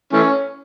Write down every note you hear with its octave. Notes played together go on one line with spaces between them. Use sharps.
E3 A3 C#4